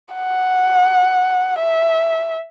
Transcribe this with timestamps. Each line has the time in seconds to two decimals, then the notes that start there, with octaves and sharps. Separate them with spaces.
0.14 F#5
1.58 E5